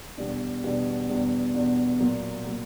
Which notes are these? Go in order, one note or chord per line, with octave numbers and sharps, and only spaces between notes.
E2 B2 G3 B3 D4
E2 B2 G3 B3 D4
E2 B2 G3 B3 D4
E2 B2 G3 B3 D4
A#2 F#3 A#3
A#2 F#3 A#3